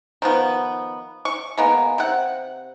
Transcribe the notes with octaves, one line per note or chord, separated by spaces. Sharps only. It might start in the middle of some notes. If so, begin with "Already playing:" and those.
D#3 F3 B3
C#6
G#3 A#3 B3
C3 F#5